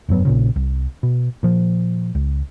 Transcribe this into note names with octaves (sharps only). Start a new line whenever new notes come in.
F1 G2 F#3 B3
A#1 A#2 C#3
C2
B2
A#2 F3
C#2